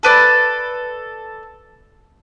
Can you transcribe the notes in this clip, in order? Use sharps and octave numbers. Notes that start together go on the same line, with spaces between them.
A4 B4 D5